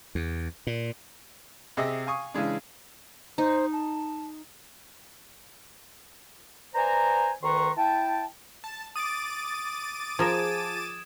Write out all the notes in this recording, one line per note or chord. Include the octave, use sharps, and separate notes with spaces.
E2
A#2
C3 G4 G#4 D#5 E5
F5 G#5 C#6 D#6
C#3 E3 G#3 D4
D#4 C5
A5
B4 C5 D5 G#5 A#5
D2 D#3 B4 A#5 C6 C#6
E4 G5 A5
A5
D6 D#6 A6 D7 D#7
F3 F4 G#4 A#4 A5 G#6 E7